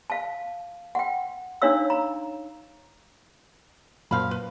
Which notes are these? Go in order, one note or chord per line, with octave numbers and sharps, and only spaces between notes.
F5 A5
F#5 G5
D4 D#4 C#5 F5 E6
A#5
F#2 A#2 F3 F5 B5
B4